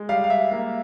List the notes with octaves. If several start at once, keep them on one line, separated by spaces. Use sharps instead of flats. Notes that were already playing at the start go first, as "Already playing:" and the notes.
Already playing: G#3
G3 F5
F5
E5
A#3 F5